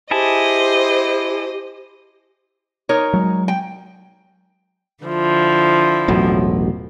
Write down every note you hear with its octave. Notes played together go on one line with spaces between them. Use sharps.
E4 G4 G#4 C5 D#5 A5
D#4 A#4 C#5
F#3 G#3
G5
D3 F3 E4
E1 A1 F#3